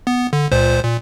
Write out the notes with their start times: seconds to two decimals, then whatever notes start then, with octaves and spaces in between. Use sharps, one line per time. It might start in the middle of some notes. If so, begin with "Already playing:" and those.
0.07 B3
0.33 D3
0.52 C#2 A#2 C5
0.85 A#2